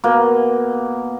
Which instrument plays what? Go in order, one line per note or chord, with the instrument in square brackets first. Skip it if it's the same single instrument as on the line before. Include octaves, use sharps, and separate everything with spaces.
[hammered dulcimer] B2 A#3